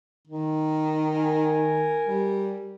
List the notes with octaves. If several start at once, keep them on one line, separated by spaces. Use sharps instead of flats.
D#3
A#4 G#5
G3